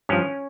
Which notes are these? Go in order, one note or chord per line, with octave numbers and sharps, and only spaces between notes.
G2 F3 C#4